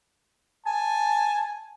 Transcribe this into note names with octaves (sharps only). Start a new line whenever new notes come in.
G#5 A5